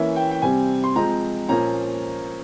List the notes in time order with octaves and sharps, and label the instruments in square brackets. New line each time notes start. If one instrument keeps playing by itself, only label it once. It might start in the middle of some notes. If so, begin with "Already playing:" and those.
Already playing: [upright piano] E3 A#3 C#4 E5
G5
G5
C3 G3 C4 G#5
C6
F3 G#3 C4 A#5
A#2 F3 A#3 C#4 A#5